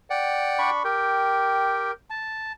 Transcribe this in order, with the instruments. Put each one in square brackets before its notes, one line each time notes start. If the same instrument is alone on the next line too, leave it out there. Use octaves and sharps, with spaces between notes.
[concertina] D5 F#5 G5
[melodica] D4 B5 C#6
[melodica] G4 G5 [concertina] A#4
[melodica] A5